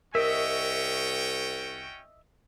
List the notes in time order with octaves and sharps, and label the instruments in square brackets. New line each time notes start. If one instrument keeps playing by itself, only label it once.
[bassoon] C2 [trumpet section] C#4 F#4 G5 [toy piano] A#4 [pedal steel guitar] D#5 E5